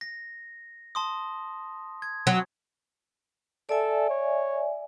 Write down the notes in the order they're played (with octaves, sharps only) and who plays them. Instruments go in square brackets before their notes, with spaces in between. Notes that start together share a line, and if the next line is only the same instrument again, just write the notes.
[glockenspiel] A#6
A5 C6 D#6
G#6
[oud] F#3
[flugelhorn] A4 [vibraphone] D5 E5 G#5
[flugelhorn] C#5